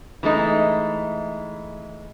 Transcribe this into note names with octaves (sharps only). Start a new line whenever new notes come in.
E3 G#3 A3 D#4